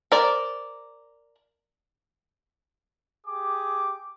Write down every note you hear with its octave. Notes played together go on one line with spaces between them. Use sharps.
A#4 C5 D5
G4 G#4 D6